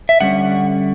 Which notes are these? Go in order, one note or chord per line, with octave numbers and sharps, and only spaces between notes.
E5
D3 G3 C#4 F#5